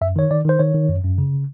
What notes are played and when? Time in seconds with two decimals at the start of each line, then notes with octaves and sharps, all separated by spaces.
0.01 F#2 E5
0.16 D#3 C#5
0.31 D#3 D5
0.45 D#3 C5
0.59 D#3 C#5
0.74 D#3
0.89 F#2
1.04 F#2
1.18 C#3